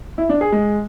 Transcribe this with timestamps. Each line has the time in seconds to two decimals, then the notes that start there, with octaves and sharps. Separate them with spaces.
0.18 E4
0.29 D4
0.41 G#4
0.52 G#3